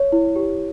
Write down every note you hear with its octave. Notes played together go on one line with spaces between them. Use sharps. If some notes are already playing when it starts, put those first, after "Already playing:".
Already playing: C#5
E4
G4